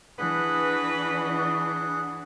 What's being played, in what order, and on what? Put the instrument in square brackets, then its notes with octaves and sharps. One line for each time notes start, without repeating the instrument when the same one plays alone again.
[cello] E3 D4 [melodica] G#4 F#5 [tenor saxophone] B4